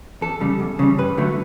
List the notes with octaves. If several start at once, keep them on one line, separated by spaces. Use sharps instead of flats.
E2 A4
C#3 G3
E2
C#3 G3
G2 B4
D3 F#3 A3